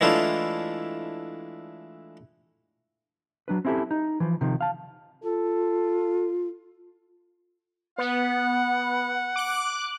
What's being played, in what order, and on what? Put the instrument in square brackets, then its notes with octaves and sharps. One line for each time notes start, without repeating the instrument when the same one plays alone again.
[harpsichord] E3 G#3 A3 D4 E4 F4
[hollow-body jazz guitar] F#3 D4 B4
C4 C#4 E4 F4 G4 A4
D#4
E3 F3
C3 D#3 F3
F5 A5
[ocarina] F4 [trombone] A4
[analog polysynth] B3 [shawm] F#5
[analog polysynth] D6 F#6